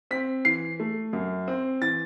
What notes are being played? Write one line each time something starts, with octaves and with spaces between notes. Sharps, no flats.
C4 B6
E3 C7
A3
F#2
C4
E3 A6